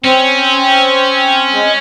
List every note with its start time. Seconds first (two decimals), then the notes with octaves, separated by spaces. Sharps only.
0.04 C4 C#4
1.53 G#3